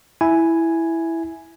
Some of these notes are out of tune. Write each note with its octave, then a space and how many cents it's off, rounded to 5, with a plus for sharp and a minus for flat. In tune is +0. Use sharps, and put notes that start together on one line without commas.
E4 +0 G#5 +0